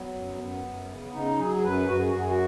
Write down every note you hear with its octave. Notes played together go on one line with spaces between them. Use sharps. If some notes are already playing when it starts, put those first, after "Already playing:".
Already playing: F#3 B3
F#2
F#2 B3
F#2
C#3
C#3 D#4
F#3 G#4
G#4
F#2 B4
F#2 F#4
G#4
F#2 F#4
G#4
F#4